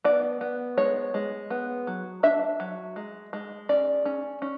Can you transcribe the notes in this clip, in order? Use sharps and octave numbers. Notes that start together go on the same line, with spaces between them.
B3 D5
B3
G#3 C#5
G#3
B3
F#3
D4 E5
F#3
G#3
G#3
C#4 D5
C#4
C#4